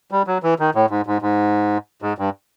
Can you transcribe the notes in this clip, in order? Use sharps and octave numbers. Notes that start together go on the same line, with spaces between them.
G3
F#3
E3
D#3
A2
G#2
G#2
G#2
G#2
G2